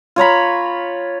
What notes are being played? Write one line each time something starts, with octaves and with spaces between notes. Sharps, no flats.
F4 C#5 A#5 B5